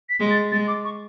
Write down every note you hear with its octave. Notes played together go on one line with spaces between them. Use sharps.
B6
G#3
A6
G#3 A6
D6
C#6